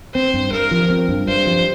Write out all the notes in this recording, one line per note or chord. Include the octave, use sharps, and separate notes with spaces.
C4 C5
G2
G2 A#4
F3
C4
G2
G2 C5
F3